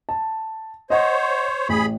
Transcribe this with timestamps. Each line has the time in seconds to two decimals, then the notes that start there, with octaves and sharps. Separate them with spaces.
0.09 A5
0.90 C5 C#5 D#5 F#5
1.69 A1 G#4 B5